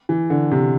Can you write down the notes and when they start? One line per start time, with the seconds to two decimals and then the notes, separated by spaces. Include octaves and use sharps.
0.09 E3
0.30 D3
0.51 C3